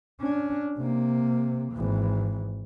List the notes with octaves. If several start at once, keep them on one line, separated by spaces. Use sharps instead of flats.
C#4 D4
C3 A#3
G#1 E3